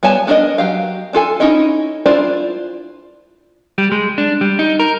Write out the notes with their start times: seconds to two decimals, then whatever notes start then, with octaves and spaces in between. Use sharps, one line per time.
0.03 G3 B3 C#5 G#5 A5
0.27 B3 D4 A#4 C#5 D#5
0.58 F#3 G4 F5
1.13 D4 F4 A4 G#5
1.40 C#4 D#4 E4 D#5
2.06 D4 E4 F4 C5 D5
3.78 G3
3.92 G#3
4.18 D4
4.41 G3
4.59 D#4
4.80 A#4